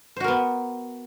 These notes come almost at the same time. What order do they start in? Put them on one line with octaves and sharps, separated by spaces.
C5 F#4 A#4 B3